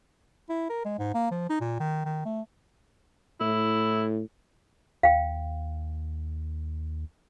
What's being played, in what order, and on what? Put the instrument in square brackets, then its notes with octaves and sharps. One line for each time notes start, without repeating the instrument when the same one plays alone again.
[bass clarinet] E4
A#4
G#3
G#2
A#3
F3
D#4
A#2
D#3
D#3
A3
[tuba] A2 [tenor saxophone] E4
[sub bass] D#2 [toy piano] F5 G5